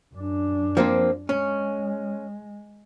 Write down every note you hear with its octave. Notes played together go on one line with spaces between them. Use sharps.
F#2 D4
F3 A#3 C4
G#3 C#4